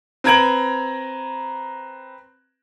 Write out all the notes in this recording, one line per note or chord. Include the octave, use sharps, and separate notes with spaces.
C4 B4 A#5 G#6 D7 F#7